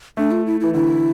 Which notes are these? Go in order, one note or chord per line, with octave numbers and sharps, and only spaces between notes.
A3 D4
F4
E4
E3 E4
D3 E4